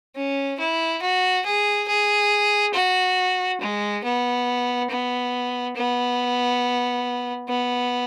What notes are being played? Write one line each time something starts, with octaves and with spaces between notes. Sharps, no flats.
C#4
E4
F#4
G#4
G#4
F#4
G#3
B3
B3
B3
B3